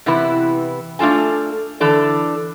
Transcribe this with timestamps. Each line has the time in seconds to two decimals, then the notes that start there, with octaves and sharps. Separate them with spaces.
0.06 C3 E3 B3 E4 B4
0.99 A3 D4 F4 A4 G#5
1.80 D3 E3 A4 D5